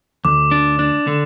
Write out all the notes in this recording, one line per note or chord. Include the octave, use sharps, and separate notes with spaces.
D2 D6
D4
D4
D3